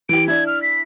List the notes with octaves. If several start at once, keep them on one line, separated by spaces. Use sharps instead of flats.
E3 G4 D7
D4 E4 G#6
F6
B6